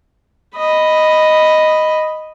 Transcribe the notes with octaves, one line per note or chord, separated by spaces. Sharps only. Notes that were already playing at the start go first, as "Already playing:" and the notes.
D#5 B5